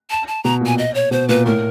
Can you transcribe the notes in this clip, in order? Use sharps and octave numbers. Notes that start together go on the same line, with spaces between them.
A5
A5
B2 A#5
A#2
G#5
D#5
C#5
B2 C5
A#2 B4
A2 A#4